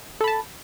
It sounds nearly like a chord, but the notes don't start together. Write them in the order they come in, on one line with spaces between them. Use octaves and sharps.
A4 B5 A5